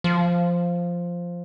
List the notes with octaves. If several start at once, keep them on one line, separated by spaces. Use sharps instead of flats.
F3